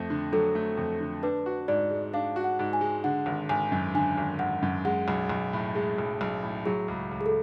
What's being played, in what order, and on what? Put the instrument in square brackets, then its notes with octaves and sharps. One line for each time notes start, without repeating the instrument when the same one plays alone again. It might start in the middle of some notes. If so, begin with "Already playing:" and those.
Already playing: [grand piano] F2 A3
D3
[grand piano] F#3 [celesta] A4
[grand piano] A3
F2
D3
[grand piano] D4 [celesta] B4
[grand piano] F#4
[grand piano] G#2 [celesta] D5
[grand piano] G#3
[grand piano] D4 [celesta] F5
[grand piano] F#4
[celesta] F#5
[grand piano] G#2
[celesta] G#5
[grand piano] G#3
[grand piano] D3 [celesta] F#5
[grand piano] G#1
[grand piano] G#1 [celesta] G#5
[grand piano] F#2
[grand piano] D3 [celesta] G#5
[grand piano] G#1
[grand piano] G#1 [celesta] F#5
[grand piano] F#2
[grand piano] G#3 [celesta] F#5
[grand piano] B1
B1
A2
[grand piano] G#3 [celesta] G#4
[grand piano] B1
B1
A2
[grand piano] F#3 [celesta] G#4
[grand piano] C#2
C#2
[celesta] G#4
A4